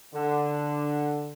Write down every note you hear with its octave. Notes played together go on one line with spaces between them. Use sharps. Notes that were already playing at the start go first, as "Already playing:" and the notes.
D3